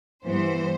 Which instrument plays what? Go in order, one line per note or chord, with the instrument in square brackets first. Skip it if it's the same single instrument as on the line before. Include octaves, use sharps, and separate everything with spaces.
[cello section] G2 E3 B3 [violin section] C5